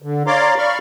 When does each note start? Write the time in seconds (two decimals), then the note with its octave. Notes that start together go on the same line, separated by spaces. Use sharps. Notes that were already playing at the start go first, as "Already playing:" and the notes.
0.02 D3
0.27 C#5 D5 F5 A#5 C6 D6
0.58 D5 F5 B5 C#6 F6